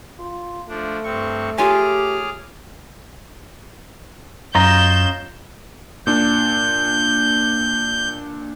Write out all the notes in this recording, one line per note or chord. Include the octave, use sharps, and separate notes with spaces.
F4
F3 A3 D4
G2 C4 C#6
F4 G4 G#4 C#5 G#5 D6 F6
F#2 C#4 F4 D#5 A#5 G6 E7
A#2 D4 G6